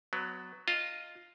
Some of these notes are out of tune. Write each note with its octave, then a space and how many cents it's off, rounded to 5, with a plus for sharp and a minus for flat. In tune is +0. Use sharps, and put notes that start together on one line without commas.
F#3 +0 B3 +20
F4 +0 D#5 +0 A#5 -45